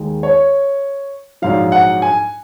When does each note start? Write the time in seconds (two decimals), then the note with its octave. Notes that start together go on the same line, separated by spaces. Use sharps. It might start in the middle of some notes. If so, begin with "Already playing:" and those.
Already playing: D#2 D#3 G#3
0.23 C#5
1.42 A#1 G#2 F#3 F5
1.72 F#5
2.02 G#5